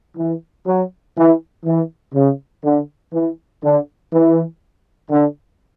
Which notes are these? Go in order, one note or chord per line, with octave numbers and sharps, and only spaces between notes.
E3
F#3
E3
E3
C#3
D3
E3
D3
E3
D3